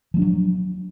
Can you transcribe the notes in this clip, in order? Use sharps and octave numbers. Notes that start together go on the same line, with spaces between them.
F3 F#3 G#3 D4